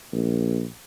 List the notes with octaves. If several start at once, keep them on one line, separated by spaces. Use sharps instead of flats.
A#1